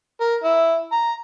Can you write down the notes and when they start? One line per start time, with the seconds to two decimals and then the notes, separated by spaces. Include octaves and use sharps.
0.21 A#4
0.44 E4
0.92 A#5